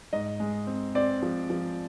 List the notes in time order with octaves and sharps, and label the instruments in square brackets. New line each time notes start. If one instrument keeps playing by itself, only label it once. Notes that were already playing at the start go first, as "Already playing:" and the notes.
[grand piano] G#2 D#5
G#3
C4
C4 D5
F3
F3